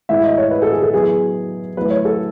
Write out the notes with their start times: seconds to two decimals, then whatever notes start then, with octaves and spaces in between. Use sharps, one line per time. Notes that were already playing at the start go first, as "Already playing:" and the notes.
0.09 A2 E3 G#3 E5
0.23 D#5
0.38 C#5
0.51 B4
0.62 A4
0.72 G#4
0.82 A4
0.93 F#3 B3 E4 G#4
1.77 F#3 A3 E4 B4
1.90 C#5
2.05 A4